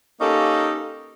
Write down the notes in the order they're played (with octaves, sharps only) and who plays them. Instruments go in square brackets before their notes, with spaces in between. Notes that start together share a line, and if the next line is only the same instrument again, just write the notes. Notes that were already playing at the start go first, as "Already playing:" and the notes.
[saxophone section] A#3 C#4 D#4 G4 A4